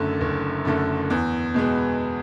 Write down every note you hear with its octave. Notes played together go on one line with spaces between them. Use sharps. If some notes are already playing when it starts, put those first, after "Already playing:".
Already playing: F#1 F#2 D3 A3
F#1
F#2 D3 A3
E2
B2 G#3 B3